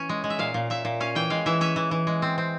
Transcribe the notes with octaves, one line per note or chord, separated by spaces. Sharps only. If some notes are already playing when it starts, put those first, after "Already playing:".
Already playing: E3 C#4
G#3
G#3
E5
A#2 F5
A#2
A#2 E5
A#2
C#4 F5
E3 G5
G#3 F5
E3 E5
C#4 E5
E3
E3
G#3
C4
C4